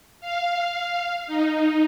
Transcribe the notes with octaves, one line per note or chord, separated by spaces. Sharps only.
F5
D#4